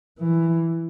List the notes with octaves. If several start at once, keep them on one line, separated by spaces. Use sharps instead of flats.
E3